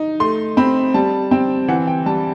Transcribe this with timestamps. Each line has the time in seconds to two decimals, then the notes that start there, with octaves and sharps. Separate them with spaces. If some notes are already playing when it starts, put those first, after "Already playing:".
Already playing: D#4
0.20 A3 C6
0.57 C4 B5
0.94 G3 A5
1.31 C4 G5
1.68 E3 F#5
1.87 G5
2.06 G3 A5